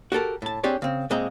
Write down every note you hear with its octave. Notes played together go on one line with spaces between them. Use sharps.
F#4 G4 A4 A#4
A2 A5
C4 D4 G4 G#4 C#5 D5
C#3 C4
A#2 G#3 C4 D#5 A#5